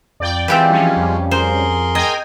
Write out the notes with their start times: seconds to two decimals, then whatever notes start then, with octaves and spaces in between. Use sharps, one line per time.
0.20 F2 D5 G5
0.48 E3 G#3 C4 F4 G4 B4
0.70 F3 G3 C#4
0.97 F2
1.31 G#4 A#4 C5 C6
1.95 D#5 G5 G#5 A#5